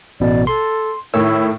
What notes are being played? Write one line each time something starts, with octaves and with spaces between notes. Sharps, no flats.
A1 B2 D5
A4 C6
A2 D#3 A3 E4 C#5 E6